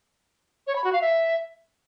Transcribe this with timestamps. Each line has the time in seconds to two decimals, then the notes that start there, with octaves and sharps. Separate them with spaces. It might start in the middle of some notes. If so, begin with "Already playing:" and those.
0.67 C#5
0.76 B5
0.84 F#4
0.93 F5
1.01 E5